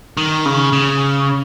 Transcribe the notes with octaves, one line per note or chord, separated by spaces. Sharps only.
D#3
C#3
C#3